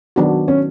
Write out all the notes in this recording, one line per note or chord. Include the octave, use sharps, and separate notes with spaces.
D#3 F#3 B3 D4 F#4
C#4